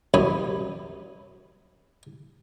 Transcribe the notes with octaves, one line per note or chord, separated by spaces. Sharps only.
C2 F#2 C#4 G#5 B5 D#6